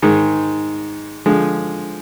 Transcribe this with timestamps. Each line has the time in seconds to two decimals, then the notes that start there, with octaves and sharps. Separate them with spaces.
0.02 G#2 D#3 G#3
1.26 D3 F3 G#3